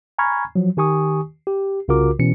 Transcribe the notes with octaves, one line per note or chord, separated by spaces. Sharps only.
G#5 A#5 B5 C#6 F6 G#6
F3 F#3
D#3 G4 G#5 C#6 D#6
G4
C2 C#3 F4 F#4 A#4 D6
B2 E3 C#4 C#7